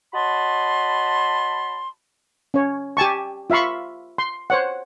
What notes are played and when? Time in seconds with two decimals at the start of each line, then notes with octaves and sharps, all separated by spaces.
0.14 F#4 C#5 D#5 A5 B5 C6
2.54 C#4 C#5
2.97 G4 G#5 A5 C#6
3.50 F4 E5 F5 B5 C#6
4.18 C6
4.50 C5 C#5 F#5